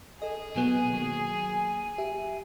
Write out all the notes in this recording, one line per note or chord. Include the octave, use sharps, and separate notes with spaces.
G#4 A4 D#5
B2 F#3 B3 G#5
D#3 F#3 A#3
G4 E5